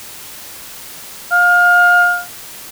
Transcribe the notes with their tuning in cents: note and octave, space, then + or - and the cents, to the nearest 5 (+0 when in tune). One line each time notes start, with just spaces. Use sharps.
F5 +25